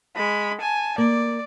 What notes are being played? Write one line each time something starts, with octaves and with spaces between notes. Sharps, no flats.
G#3 B5
G#5 A5
A#3 D5